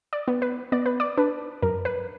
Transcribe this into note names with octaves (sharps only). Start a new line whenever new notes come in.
D5
B3
B4
B3 D5
B4
D5
D4 B4
F#2 A#4
B4